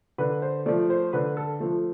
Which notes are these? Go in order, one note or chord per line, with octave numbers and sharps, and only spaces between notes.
D3 B4
C5
F3 A3 D5
C5
D3 B4
A4
F3 A3